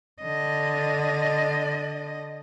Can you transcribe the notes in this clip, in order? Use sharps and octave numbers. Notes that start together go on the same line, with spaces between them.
D3 D#5